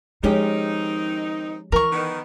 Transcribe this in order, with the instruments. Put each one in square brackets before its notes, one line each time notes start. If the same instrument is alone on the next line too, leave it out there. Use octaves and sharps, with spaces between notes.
[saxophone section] D#3 C4 D#4 [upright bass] F3 [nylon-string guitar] G#3 C#4 G4
[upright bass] E3 [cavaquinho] A#4 C#6
[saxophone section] D#3 B3